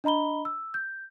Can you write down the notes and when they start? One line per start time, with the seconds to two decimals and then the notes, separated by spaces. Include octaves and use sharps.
0.04 D4 D#5 A#5 B5 G7
0.45 E6
0.74 G6